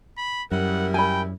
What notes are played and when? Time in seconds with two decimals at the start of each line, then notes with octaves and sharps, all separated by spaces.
0.17 B5
0.52 F#2 G3 E4 A#4 F#5
0.94 G5 G#5 B5